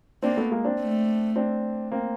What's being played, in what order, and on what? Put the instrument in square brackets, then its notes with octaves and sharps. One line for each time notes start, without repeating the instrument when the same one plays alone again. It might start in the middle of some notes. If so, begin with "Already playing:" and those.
[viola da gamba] A#3 [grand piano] C4 D4
[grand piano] A3 B3
G#3 A#3
C4 D4
[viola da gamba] A3
[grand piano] C4 D4
A#3 C4